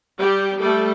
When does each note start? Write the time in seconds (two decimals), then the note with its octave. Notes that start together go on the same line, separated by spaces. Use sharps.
0.19 G3 G4
0.61 G3 A3 A4